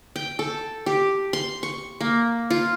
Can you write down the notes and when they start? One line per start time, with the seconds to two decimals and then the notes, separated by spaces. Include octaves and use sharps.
0.16 G5
0.39 A4
0.86 G4
1.33 C6
1.63 C#6
2.01 A#3
2.50 F4